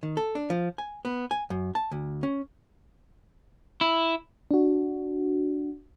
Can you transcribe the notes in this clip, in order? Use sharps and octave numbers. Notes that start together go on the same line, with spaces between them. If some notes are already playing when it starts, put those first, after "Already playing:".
D#3
A4
D4
F3
G#5
B3
G#5
F#2
A5
D2
C#4
E4
D4 F#4